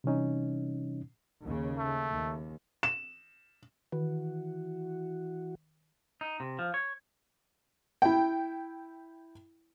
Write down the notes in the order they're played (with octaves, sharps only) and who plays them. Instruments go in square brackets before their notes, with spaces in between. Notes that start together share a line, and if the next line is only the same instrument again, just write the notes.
[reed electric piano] C3 E3 G3 C#4 D#4
[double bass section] D#2 C#3
[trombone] A3
[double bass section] D#2
[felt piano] E7
[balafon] D#3 [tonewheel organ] E3 F#4
[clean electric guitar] D#4
C3
F3
C#5
[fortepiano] E4 G5